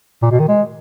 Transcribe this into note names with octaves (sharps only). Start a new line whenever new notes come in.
A#2
B2
D#3
G#3